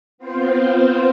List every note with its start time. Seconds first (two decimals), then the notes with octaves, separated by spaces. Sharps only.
0.18 B3 C4 F4 C5